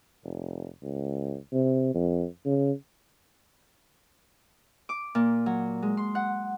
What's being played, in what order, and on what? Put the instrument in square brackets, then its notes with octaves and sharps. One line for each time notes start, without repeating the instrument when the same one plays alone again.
[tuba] F1
C#2
C3
F2
C#3
[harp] D6
A#2
F#3
G#3
C6
F#5